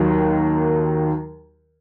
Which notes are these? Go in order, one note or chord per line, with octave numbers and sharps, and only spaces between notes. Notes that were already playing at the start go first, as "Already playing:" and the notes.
Already playing: D#2 D#3 F#3